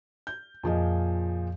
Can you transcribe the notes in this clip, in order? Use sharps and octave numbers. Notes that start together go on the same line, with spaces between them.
G6
F2 A#2 F3 G#4 D#5